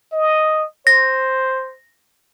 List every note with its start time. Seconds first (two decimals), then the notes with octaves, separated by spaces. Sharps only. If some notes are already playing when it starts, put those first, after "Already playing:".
0.13 D#5
0.87 C5 A#6